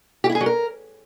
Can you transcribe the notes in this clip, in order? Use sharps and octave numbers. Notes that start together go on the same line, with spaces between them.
G4
E4
G#4
F#3
A#4